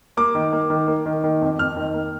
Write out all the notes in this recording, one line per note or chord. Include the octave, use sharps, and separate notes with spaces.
A#3 D6
D#3
A#3
D#3
A#3
D#3
D#3
F2
F2 F6
D#3
A#3